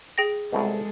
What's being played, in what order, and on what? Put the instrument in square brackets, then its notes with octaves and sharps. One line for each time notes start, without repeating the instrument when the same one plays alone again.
[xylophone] G#4 G5 A#6
[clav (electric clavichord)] C2 B2 [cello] G#3 A4